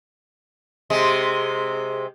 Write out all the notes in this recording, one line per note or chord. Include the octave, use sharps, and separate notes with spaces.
C3 G#3